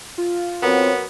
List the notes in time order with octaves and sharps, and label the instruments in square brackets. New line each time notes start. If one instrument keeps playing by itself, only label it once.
[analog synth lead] F4
[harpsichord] F#2 [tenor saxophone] B3 [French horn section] C4 C#5